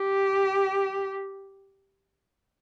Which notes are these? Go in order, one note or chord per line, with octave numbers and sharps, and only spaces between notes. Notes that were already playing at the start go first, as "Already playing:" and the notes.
Already playing: G4